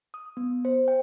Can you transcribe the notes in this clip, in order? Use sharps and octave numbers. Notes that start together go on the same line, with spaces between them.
D#6
B3
C5
G5